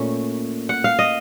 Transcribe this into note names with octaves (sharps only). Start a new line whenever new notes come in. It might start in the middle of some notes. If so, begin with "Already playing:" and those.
Already playing: A#2 A3 C#4
F#5
F5
D#5